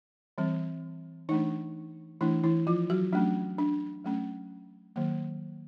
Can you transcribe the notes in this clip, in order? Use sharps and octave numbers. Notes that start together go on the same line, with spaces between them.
E3 G3 C4
E3 A3 D4 D#4
E3 A3 D4 E4
E3 E4
F3 F4
F#3 F#4
F#3 A3 C#4 D4
D4
F#3 A3 C#4
D#3 F#3 A#3